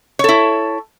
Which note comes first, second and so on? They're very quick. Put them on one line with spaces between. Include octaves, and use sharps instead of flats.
C#5 A4 E4